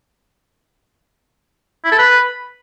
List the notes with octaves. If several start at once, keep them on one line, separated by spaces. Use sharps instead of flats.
E4
A4
B4